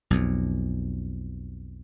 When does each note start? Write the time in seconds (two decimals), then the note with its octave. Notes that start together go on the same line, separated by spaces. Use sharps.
0.10 B1 F2